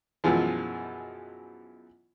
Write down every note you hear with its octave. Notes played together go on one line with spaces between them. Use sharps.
F#2 B2 E3 F3 G#3